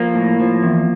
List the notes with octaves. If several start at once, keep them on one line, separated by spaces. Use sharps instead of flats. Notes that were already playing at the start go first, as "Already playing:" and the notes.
Already playing: F3 A#3
A2
F3
E2